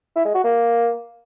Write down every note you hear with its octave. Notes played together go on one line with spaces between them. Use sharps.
E4
G#3
F#4
A#3